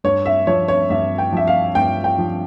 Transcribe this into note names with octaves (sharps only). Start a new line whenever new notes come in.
G2 C#5
E5
F3 C#5
C#5
G2 E5
G5
F3 E5
F5
G2 G5
G5
F3